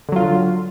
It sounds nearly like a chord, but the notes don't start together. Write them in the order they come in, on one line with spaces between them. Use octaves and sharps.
D3 F#3 F4